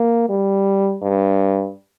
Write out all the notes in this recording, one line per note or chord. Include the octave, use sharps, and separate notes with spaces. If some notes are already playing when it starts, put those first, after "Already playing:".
Already playing: A#3
G3
G2